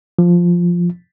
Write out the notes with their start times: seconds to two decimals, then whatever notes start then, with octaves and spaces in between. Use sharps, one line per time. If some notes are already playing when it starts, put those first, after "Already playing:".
0.19 F3